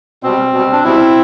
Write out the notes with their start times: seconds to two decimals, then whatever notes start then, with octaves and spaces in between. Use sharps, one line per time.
0.23 B2 G3 C4
0.53 B2
0.59 G3
0.72 D4
0.84 B2 G3 C4 E4